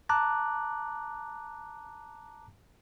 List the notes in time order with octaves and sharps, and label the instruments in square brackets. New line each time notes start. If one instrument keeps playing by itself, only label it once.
[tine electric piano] A5 A#5 D6 F#6